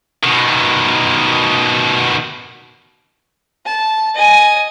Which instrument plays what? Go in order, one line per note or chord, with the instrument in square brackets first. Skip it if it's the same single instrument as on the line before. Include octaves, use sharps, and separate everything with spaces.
[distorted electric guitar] B2 D#3
[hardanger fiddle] A5
D#5 G#5